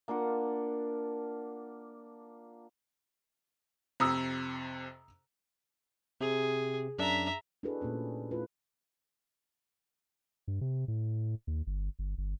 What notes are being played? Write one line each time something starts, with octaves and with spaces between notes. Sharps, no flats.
A#3 D4 F4 F#5
F2 C3 A#5 D#6 E6
C3 G#4
F#2 D4 E5 A#5 B6
D4 E4 F#4 G#4 A4 B4
A#2 A3 C#4 C5
A3 E4 F4 B4
G2
C3
A2
D#2
G1
G1
G1